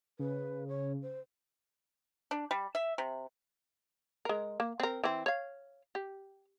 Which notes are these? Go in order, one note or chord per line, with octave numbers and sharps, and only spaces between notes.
C#3 B4
C#5
C5
D4
G3
E5
C3
G#3 A#4
A#3
C4 A#4
E3 C4
C#5 F5
G4